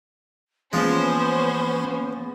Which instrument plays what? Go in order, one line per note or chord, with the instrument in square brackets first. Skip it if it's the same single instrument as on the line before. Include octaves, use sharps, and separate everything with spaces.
[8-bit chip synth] E3 A#3 [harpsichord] F3 G#3 [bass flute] B3 [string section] C#4 C5